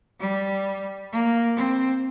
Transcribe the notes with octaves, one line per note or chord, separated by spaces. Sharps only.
G3
A#3
C4